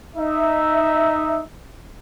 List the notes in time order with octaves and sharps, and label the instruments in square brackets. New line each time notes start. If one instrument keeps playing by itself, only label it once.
[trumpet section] D#4 E5